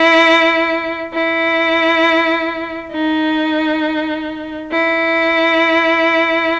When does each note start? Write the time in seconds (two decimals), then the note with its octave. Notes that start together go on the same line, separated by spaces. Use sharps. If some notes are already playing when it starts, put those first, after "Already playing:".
Already playing: E4
1.13 E4
2.93 D#4
4.72 E4